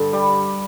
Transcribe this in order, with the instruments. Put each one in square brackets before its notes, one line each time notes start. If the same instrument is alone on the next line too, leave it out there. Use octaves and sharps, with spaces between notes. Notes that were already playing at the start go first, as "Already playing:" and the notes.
Already playing: [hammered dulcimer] G2 D3
G3